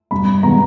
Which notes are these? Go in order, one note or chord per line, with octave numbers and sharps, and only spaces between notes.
G2 B5
D#3 G#3 B3 A#5